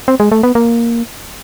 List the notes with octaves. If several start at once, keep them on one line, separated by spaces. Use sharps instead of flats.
C4
G#3
A3
B3
A#3